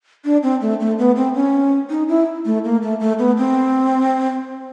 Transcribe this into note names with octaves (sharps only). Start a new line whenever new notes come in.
D4
C4
A3
A3
B3
C4
C#4
D#4
E4
A3
A#3
A3
A3
B3
C4